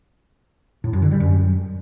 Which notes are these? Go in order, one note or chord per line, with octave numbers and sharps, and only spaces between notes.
A2
F#2
D3
G3
F#2